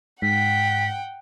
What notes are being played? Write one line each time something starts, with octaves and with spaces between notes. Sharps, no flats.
G#2 F#5 G5 B6